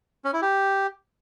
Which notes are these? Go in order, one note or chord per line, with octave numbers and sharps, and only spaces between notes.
C#4
E4
G4